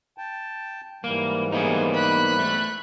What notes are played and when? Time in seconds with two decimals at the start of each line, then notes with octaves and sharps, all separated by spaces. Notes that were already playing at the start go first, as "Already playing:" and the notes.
0.18 G5 A5
1.04 G#2 E3 G3 A#3
1.52 A#3 B3 D#4 G#4
1.94 B5 F#6
2.39 A3